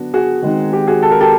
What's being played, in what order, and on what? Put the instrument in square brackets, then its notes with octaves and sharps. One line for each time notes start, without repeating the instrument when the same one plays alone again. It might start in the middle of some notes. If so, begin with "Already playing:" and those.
Already playing: [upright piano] D3 F#3 B3 D4 F#4
F#4 G#4
D#3 G#3 C4 D#4
G4
F#4 G#4
A4
A#4
G4 A4